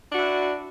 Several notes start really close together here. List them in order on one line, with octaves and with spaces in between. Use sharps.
D4 F#4 E4